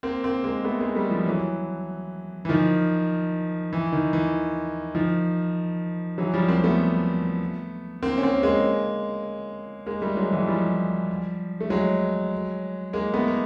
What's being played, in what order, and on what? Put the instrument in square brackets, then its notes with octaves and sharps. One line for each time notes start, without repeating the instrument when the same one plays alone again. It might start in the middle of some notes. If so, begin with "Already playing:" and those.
[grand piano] A#3 C4
A#3 C4
G#3 A#3
A3 B3
G#3 A#3
G3 A3
F3 G3
E3 F#3
E3
D#3 F3
E3
D#3
E3
D#3 F3
E3 F#3
F3 G3
A#3 C4
C4
A3 B3
A#3 C4
C#4
A#3 C4
G#3 A#3
G#3 A#3
G3 A3
F#3 G#3
E3 F#3
F3 G3
A3
F#3 G#3
G#3 A#3
A3 B3
A#3